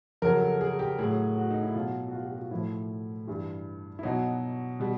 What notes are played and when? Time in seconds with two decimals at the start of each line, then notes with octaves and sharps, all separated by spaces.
0.22 F2 C#3 F#3 A#4
0.41 A4
0.61 G#4
0.79 G4
0.99 A2 F#3 G#4
1.37 F#4
1.51 D#4
1.63 E4
1.74 B2 F#3 F4
2.08 F#4
2.13 F4
2.23 G4
2.32 F#4
2.41 F4
2.51 A2 F3 E4
3.27 G2 E3 G3
3.99 E4
4.03 B2 F#3 D#4
4.80 B2 G3